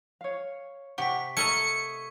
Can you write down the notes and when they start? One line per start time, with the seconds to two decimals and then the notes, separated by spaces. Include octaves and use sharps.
0.21 C#5 F5
0.98 C3 G4 F#5 G5 C#6 B6
1.37 A3 A#4 D#5 C#6 G#6 C#7 D#7